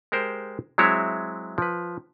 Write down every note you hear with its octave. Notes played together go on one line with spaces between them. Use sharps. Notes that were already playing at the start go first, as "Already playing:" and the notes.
G#3 G4 A#4 C5
F#3 G#3 C4 E4 C#5 E5
F3 B4